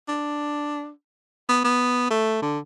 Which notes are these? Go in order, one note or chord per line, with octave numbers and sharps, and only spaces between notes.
D4
B3
B3
A3
D3